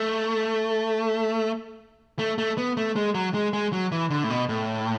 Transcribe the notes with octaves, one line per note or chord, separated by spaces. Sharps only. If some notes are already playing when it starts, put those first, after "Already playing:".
Already playing: A3
A3
A3
B3
A3
G#3
F#3
G#3
G#3
F#3
E3
D3
A2
B2
A2